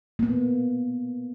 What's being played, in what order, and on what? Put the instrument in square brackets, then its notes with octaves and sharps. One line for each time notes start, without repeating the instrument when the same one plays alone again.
[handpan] A#3 B3